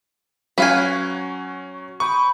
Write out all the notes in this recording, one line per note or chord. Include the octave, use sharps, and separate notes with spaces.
F#3 C#4 B4 C#5 F5 G#5
G5 B5 C#6 D#6